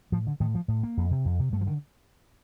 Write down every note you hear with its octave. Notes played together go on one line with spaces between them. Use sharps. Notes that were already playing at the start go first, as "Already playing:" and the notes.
A2 F3
D3
A2 D#3
F3
A2
A#3
F2
C3
F2
C3
G2 A3
F3
D3 D#3